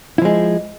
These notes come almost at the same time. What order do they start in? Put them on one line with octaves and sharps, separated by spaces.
E4 F3 G#3